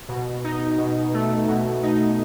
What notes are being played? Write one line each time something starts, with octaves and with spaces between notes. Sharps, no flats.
B2
D#4
B2
A3
B2
D#4